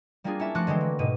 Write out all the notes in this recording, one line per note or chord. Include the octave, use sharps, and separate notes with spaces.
G3 A#3 C4 D4 F4 G#4
C#4 E4 E5 A5
F3 A3 F#4 C6 D6 F#6
D3 E3 G#3 C4
A#3
G#2 B2 B4 D#7